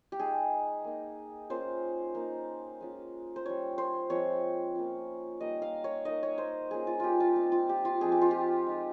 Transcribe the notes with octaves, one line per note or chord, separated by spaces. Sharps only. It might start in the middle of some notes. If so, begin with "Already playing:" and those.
G4
G#3 D#4 G#4
A#3 D#4
A#3 C#4 F4 C5
A#3 D#4
G#3 C#4 F4
C5
G3 C#4 F4 C#5
C5
F3 G#3 C4 C#5
A#3 C#4 F4
G3 A#3 D#4 D#5
F5
C#5
A#3 D#4 D#5
C#5
C5
A#3 C#4 F4 G#4
F4
F4 G4
F4
G3 C4 D#4 G4
F4
G4
F4
F3 G#3 C4 G#4
G4
F4
G4
G#3 D#4